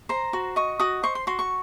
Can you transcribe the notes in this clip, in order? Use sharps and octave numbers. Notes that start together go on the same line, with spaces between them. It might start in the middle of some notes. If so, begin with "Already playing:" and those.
C5 A#5
F#4
D#5 C#6
F#4 D#6
C5 C#6
C6
F#4 C6
C#6